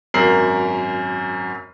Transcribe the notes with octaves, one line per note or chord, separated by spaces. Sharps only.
G#1 F#2 A#4 C7 F#7